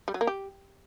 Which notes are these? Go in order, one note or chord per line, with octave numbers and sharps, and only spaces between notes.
G3
F#3
A#3
G4